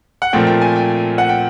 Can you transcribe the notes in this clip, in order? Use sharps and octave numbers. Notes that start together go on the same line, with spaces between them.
F#5
A#2 F3 A3 C4 G5
G5
G#5
G5
F#5
G5